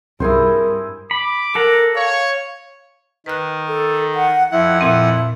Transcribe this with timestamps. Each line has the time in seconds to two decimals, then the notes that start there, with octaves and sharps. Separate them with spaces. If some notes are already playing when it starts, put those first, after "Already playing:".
0.20 C2 G2 C4 E4 G#4 A#4 C5
1.11 B5 D6
1.55 A4 A#4 F#5 A#5
1.95 C#5 F5
3.26 D#3 B4 F#6
3.68 A4
4.15 F#5
4.51 F2 E4 F#5
4.81 A#2 C4 E4